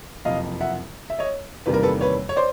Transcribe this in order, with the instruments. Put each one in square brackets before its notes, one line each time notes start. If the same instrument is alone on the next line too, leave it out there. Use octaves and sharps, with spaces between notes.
[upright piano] F#1 F2 C3 D#5 F5
E5 F#5
E5
C#5 D#5
E2 C3 D#3 G3 A#3 B4
A#4
A4 B4
B4 C#5
C#5
C5 D5